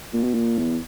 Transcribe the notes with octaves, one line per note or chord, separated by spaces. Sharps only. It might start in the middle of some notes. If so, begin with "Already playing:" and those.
A#2
B2
A#2
E2